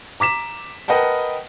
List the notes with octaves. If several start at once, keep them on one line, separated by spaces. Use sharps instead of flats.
A#5 D6 B6 E7
A#4 B4 D#5 F#5 G5 A5